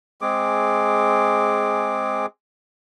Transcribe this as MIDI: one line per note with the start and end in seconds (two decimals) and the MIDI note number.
0.21 2.26 56
0.21 2.26 60
0.21 2.26 68
0.21 2.26 86